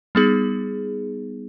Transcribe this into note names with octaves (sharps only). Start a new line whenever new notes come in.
G3 B3 D#4 G#4